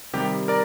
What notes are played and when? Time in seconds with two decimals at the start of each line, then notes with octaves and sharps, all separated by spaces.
0.13 C3 D#3 G3 G4
0.48 A#4 D5